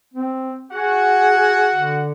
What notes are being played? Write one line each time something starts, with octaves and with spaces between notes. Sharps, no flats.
C4
F#4 G#4 F#5
D3